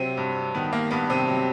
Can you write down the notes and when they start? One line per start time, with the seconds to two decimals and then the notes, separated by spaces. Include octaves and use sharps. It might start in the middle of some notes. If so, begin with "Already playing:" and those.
Already playing: C3 F#3 C4
0.17 G2
0.55 D#3 B3
0.73 A#3
0.91 G2 B3
1.10 C3 C4
1.28 F#3